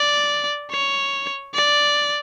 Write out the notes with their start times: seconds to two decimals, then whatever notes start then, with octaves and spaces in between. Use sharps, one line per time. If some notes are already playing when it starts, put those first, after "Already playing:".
Already playing: D5
0.71 C#5
1.54 D5